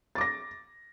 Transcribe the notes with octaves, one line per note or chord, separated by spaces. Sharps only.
D6 A6 A#6